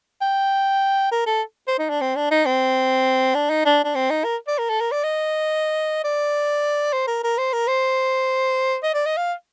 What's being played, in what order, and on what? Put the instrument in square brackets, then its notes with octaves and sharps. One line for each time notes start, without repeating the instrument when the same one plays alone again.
[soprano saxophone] G5
A#4
A4
C5
D#4
D4
C4
D4
D#4
C4
D4
D#4
D4
D4
C4
D#4
A#4
D5
A#4
A4
A#4
D5
D#5
D5
C5
A#4
A#4
C5
A#4
C5
D#5
D5
D#5
F5